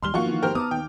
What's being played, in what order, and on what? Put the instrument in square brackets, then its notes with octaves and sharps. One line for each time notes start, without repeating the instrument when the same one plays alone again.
[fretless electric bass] D#2 G3 [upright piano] C6 F6 G7
[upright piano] G#1 [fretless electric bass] F3 F#3 A#3 [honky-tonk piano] F4 F#4 C#6
[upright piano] D#3 E3
[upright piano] G#1 G4 C5 [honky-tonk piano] A#4 G5 F6
[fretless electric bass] B3 [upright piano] A5 A#5 D6 [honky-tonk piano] D#6
[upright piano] D#2 [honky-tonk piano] G5